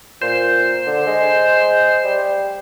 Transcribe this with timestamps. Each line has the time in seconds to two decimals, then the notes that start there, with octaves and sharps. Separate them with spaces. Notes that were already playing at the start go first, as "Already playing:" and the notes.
0.22 A#2 C5
0.87 D3
1.07 G#3
2.04 G3